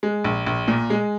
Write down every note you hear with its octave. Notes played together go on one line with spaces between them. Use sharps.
G#3
A#1
A#1
A#2
G#3